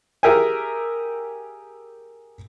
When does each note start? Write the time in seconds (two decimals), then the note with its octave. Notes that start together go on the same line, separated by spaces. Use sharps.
0.23 G4 G#4 A#4 E5 G5 G#5